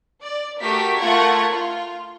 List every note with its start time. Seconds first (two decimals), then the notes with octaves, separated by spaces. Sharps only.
0.22 D5
0.61 A3 F#4 G4 A4 A#4 B6
0.98 A3 F4 A#4 F#5 C#6 G#6
1.51 F4